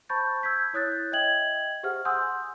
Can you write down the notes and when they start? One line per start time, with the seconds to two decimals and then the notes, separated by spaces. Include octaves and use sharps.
0.09 C5 A5 B5 C#6 G6 A6
0.43 E6 G6 G#6 B6
0.73 E4 C#5 D#6 F#6 G6 A6
1.12 D#5 E5 G5 G#6 F#7
1.83 G4 G#4 C5 E5 F#5 F6
2.05 F#5 G#5 C6 D#6 E6 G6